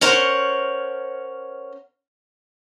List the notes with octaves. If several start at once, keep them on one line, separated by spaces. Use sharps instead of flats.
C#4 A#4 C5 C#5 F#5